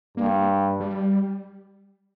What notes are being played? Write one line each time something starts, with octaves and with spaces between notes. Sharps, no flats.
G2 A#3
G3